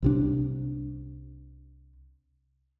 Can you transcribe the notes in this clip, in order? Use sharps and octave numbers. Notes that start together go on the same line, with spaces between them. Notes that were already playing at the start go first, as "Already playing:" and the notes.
C2 C3 D4